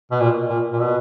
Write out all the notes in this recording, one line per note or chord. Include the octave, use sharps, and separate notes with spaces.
B2
A#2
A#2
A#2
B2